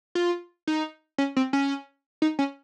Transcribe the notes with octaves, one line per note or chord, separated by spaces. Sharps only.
F4
D#4
C#4
C4
C#4
D#4
C#4